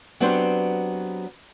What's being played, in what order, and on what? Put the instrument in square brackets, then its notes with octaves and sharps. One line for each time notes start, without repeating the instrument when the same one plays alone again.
[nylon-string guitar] F#3 B3 C4 D4 G4 C5